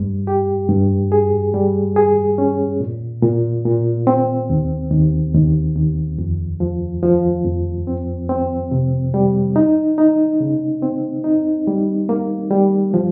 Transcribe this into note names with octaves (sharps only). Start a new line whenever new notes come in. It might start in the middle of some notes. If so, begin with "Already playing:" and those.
Already playing: G2 G3
G4
G2
G#4
G3
G#4
C#4
A#2
A#2
A#2
C4
D#2
D#2
D#2
D#2
F2
F3
F3
F2
C4
C4
C3
G3
D#4
D#4
C#3
C4
D#4
G3
A#3
G3
F3